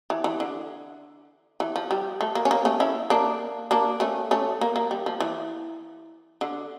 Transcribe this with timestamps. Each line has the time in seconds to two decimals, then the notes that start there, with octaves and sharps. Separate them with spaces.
0.10 E3
0.24 E3
0.40 D3
1.60 E3
1.76 F3
1.91 G3
2.21 A3
2.35 A#3
2.45 C#4
2.51 A#3
2.65 A3 C#4
2.80 C#4 E4
3.10 A#3 D4
3.71 A#3 D4
4.00 A3 C#4
4.31 A3 C#4
4.61 A#3
4.76 A#3
4.91 G3
5.06 F3
5.20 E3
6.41 D3